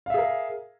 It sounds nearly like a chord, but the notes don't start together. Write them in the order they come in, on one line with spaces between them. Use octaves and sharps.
F5 E5 G#4 A#4